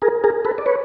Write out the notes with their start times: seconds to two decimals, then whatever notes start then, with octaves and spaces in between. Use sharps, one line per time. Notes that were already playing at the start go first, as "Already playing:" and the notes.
0.02 G#4 A#4
0.24 G#4 A#4
0.45 A4 B4
0.58 D5
0.66 B4 C#5